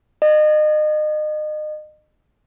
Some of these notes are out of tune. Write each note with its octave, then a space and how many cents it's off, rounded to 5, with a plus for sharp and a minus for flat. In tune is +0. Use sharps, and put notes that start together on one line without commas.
D#5 -35